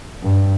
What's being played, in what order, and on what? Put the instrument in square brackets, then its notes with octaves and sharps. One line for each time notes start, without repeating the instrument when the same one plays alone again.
[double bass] G2